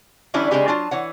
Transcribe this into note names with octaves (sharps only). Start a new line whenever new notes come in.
D3 E3 G3 C#4 D4 E4
C#3 G#3 C4 D4 G4 G#4
F#3 D4 F4 A5
E3 C#5 F#5